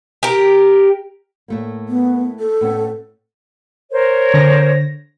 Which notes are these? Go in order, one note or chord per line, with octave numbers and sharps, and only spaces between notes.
G4 A#4
A2 A3 A#3
B3
A4
A2 B3 C#4
A#4 C5 C#5
D3 A#6